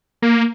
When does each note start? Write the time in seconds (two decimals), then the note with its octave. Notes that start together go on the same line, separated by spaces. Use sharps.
0.22 A#3